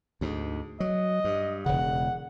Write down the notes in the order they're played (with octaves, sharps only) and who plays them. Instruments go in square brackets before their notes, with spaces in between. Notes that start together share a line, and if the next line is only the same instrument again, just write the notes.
[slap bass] D2 G#2
[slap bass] F#3 [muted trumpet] D#5
[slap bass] G2
[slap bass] E1 C#3 [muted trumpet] F#5